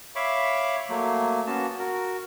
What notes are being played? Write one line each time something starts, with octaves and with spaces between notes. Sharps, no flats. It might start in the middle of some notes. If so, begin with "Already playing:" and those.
C#5 E5 F5 B5 C#6 D6
F#3 A3 A#3
A#3 B3 C#4 F#4 A5
F#4 A#4